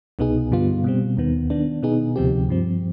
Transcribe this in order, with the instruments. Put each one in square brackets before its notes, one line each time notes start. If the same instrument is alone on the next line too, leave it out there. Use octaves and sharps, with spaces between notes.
[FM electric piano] C2 B2 B3 D#4 G#4
G2 D3 G3 B3 F4
B2 G3 C4
D#2 D#3 B3
D#3 B3 D4
B2 B3 D#4 G#4
D2 C3 F3 C4 G4
G2 F3 C4